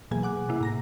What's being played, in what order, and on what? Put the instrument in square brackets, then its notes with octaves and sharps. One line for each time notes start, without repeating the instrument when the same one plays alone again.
[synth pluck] B2 E3 F#3 A#3 G#4 G#5
F#5 D6 F#6
C3 A#3 E4
A2 A#5 A#6